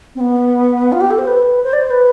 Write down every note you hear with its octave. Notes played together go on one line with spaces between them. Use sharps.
C4
B3
F4
G4
A4
C5
B4
C5
D5
C5
B4